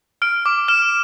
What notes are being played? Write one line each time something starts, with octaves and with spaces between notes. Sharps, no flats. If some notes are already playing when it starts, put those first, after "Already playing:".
F6 D7
D6
F6 E7